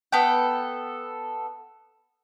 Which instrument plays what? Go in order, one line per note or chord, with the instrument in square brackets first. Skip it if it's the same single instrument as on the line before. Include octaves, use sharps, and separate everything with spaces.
[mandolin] B3 A4 G5